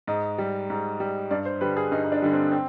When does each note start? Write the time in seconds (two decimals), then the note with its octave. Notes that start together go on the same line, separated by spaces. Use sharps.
0.07 G#2 D#5
0.38 G3
0.70 G#2
1.00 G3
1.31 G2 D5
1.45 C5
1.61 D3 G3 B4
1.77 G#4
1.92 G2 D#4
2.04 D#4
2.12 D4
2.22 D3 G3
2.33 C4
2.52 C4